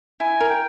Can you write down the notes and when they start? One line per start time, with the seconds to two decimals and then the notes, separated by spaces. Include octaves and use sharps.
0.20 E4 G#5
0.40 A#4
0.50 G5